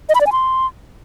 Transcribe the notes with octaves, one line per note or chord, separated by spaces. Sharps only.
D#5
B5
D5
G#5
C6